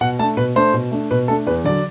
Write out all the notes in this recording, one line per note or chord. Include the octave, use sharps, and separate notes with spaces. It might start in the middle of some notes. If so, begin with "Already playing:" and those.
B2 F#5
A3 D4 A5
B2 B4
A3 D4 C5
B2
A3 D4
B2 B4
A3 D4 A4
E2 B4
D3 F#3 D5